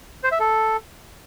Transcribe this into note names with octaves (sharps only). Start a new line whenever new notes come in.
C5
E5
A4